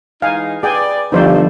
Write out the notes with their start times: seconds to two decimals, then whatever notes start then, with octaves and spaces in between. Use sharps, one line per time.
0.22 E3 G#3 D#4 F5 G#5
0.63 G#4 B4 D5 G5 G#5
1.12 G1 F3 G3 A3 D#4 C5 D5